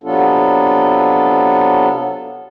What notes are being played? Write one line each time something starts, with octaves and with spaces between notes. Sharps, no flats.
C3 F#3 B3 D4 F4 A4